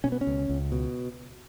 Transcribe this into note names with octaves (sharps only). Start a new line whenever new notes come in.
B2 C#4
B3
C#4
C#2
C#2
B2